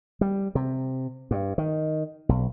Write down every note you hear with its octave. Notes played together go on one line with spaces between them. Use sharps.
G3
C3
G2
D#3
B1